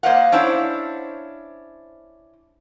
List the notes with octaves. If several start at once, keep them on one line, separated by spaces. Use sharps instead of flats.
A#3 C5 D#5 F5 F#5
C#4 D4 E4 C5 C#5